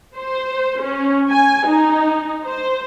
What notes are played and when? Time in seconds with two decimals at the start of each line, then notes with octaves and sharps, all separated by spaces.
0.15 C5
0.82 C#4
1.31 G#5
1.68 D#4
2.45 C5